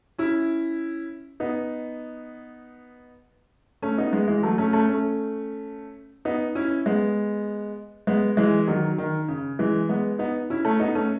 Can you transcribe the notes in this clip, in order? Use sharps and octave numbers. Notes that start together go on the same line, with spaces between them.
C#4 E4
B3 D#4
A3 C#4
B3 D#4
G#3 B3
E3 G#3
F#3 A3
A3 C#4
A3 C#4
A3 C#4
B3 D#4
C#4 E4
G#3 B3
G#3 B3
E3 G#3
D#3 F#3
D#3
C#3
E3 G#3
G#3 B3
B3 D#4
C#4 E4
A3 C#4
B3 D#4
A3 C#4